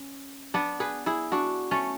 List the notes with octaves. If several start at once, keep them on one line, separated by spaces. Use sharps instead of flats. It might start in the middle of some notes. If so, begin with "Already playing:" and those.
Already playing: C#4
B3 D4
G#4 B4
E4 G#4
D4 F#4
A3 C#4